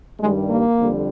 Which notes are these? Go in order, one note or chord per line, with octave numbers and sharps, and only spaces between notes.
G2 D#3 G3 G#3
A#3
F2 D3 G3